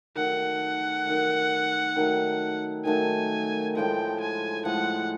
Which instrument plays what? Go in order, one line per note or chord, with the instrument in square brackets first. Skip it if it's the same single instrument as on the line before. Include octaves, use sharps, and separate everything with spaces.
[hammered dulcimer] D#3 F#3 A3 [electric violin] F#5
[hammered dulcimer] D#3 F#3 A3
D#3 F#3 A3
[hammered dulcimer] D#3 F#3 A3 [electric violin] G#5
[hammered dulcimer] A2 F3 G#3 [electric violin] G5
[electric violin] G#5
[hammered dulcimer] A2 F3 G#3 [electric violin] F#5